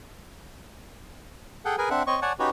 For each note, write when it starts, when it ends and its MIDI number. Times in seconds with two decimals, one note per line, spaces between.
1.65 1.76 68
1.65 1.76 69
1.65 1.76 78
1.65 1.76 79
1.78 1.89 68
1.78 1.89 70
1.78 1.89 71
1.78 1.89 80
1.90 2.03 60
1.90 2.03 62
1.90 2.03 76
1.90 2.03 78
2.07 2.20 60
2.07 2.20 73
2.07 2.20 75
2.07 2.20 85
2.22 2.33 73
2.22 2.33 74
2.22 2.33 78
2.22 2.33 80
2.22 2.33 81
2.22 2.33 85
2.39 2.50 61
2.39 2.50 63
2.39 2.50 66
2.39 2.50 67
2.39 2.50 71
2.39 2.50 73